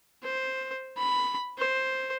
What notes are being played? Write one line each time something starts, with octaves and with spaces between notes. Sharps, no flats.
C5
B5
C5